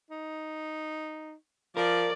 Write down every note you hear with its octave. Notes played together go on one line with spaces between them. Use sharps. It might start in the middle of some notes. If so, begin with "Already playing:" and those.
D#4
F3 A#4 D5